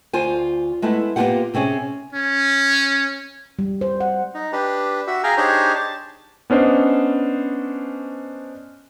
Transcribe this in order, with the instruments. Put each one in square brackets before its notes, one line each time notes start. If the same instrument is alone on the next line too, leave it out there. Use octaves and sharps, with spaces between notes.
[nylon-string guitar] D2 F4 C5 G#5
G#3 A3 B3 E4
A#3 B3 D4 F4 G4 F#5
C3 C4 C#4 G#4
[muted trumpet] C#4
[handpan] G3
C5
F#5
[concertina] D#4
D4 G4 B4
F#4 E5
G#4 F5 G5 G#5 A#5
D4 D#4 G4 G#4 C5 C#5
A5
[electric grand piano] B3 C#4 D4 C5 D#5